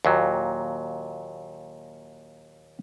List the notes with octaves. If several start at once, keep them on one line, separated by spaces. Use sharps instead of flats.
D#2 A#2 F#3